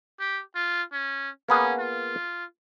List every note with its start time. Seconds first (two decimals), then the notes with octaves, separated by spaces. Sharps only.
0.20 G4
0.55 F4
0.93 C#4
1.49 A#3 B3 C#4 G#4
1.79 F4